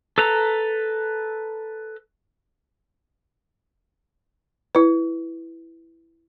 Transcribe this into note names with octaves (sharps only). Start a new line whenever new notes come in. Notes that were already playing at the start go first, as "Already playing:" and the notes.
A4 B4 A#5
E4 B4